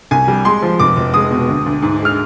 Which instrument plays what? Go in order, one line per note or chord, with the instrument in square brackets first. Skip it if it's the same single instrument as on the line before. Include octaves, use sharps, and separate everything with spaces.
[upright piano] C2 G#5
G3
G#3 C6
F3
F1 D6
F1
G#3 D#6
B2
D2
D2
G#2
G#3
F6